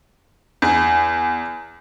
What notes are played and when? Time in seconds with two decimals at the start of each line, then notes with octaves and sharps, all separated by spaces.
0.62 E2